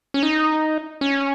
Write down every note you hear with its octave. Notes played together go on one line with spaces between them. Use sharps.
C#4
D#4
C#4